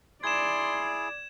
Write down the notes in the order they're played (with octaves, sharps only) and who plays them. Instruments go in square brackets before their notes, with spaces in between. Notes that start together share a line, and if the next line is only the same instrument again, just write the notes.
[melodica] E4 G#4 [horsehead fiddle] D5 [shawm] C6 [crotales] G#6 E7